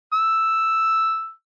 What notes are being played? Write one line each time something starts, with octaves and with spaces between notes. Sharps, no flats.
E6